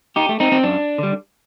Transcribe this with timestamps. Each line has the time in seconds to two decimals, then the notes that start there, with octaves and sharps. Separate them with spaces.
0.16 D#4 G4
0.29 A3
0.40 C4 D#4
0.52 C4
0.63 F#2 D4
0.98 D3 G3